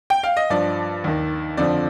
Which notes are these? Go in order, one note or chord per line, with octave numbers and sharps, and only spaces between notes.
G5
F5
D#5
G2 F3 D5
D#2 D#3
F2 D3 F3 D5